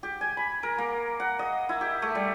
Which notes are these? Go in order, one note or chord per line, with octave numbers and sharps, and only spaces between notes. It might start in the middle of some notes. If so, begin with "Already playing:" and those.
G4
G#5
B5
A#4
A#3
F#5
D#5
E4
G4
A3
G3